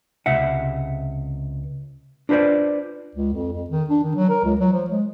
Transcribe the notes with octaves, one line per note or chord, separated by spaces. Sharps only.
C#2 C3 E5 F#5
D4 F4 B4 C5 D5
C#2
F2
F2
D#3
D4
D#3
F#3
A#4
C#2
F#3
F3
G#3